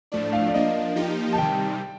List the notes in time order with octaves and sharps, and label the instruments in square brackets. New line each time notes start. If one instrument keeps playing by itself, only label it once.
[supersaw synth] A2 F3 A3 D4 [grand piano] D5
[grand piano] F5
D5
[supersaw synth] F3 A#3 D4 [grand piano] D#5
[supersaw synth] F3 A#3 D#4 G4
[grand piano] A5
[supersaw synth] C3 D#3 G3 [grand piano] G5